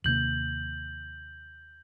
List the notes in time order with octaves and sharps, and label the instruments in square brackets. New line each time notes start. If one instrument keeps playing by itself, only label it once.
[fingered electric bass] D#2 C3 A#3 [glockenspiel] G6 F#7